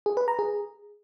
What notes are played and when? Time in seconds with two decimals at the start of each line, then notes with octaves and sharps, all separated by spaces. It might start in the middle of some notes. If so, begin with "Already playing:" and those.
0.06 G#4
0.17 B4
0.28 A#5
0.39 G#4